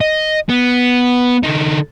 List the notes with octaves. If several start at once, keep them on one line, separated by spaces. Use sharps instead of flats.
D#5
B3
D3 D#4